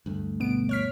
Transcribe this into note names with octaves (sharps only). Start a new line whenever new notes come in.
D2 G2 A3
B2 B3 D7
C#5 F6 B6